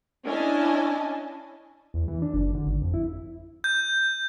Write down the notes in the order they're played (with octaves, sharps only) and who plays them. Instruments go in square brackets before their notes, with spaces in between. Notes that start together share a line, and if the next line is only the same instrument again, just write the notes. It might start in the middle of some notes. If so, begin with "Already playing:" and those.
[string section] C#4 D4 E4 D#5 G#5 A5
[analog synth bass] E2
E3
D4
F#1
D3
G#1
F2
E4
[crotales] G6